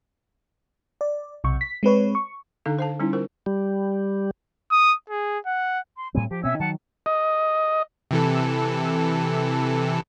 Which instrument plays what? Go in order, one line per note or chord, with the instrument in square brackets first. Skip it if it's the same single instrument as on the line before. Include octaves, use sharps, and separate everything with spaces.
[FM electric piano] D5
B1 C3 C#6
B6
G#3 C4 B4 C#5
C#6
[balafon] D3 D4 D#4 A4 F5
C5 F5 A5
G3 C#4 D#4 E4
F4 A#4 C5
[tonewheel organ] G3
[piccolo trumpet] D#6
G#4
F#5
[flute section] C6
[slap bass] A2 G3 C4 [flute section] G#5
[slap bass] F3 [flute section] G4
[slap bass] B2 C4 [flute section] C#4 E5 E6
[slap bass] D#3 F#3 [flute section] F#5 A5
[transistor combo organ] D#5
[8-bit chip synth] C3 E3 A4